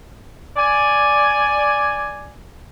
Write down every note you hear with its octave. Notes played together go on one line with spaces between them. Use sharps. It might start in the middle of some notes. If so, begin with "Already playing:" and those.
D5 G#5